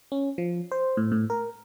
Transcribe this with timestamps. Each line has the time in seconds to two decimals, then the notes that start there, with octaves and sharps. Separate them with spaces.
0.12 C#4
0.38 F3
0.72 C5
0.97 A2
1.12 A2
1.30 A#4